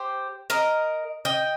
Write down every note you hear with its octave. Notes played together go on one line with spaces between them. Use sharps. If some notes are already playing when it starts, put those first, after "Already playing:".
Already playing: G4 C5
A#4 D#5
D#5 G5